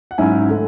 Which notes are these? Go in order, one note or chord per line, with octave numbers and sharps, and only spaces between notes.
F#5
G#2 F#3 C#4 E4 G#5
D3 A3